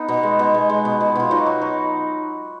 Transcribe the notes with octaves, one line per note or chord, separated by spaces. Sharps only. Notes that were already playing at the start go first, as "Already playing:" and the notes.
Already playing: B3 D#4
B2
G#3
B2
G#3
G#3
B2
B2
B2 F4
F#3 D#4 F#4
F#3
F#3